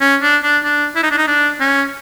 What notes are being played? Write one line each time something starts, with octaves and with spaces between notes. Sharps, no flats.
C#4
D4
D4
D4
E4
D#4
D4
D#4
D4
C#4